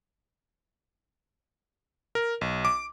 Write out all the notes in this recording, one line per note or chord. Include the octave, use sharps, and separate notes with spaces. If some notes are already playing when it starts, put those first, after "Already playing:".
A#4
B1
D6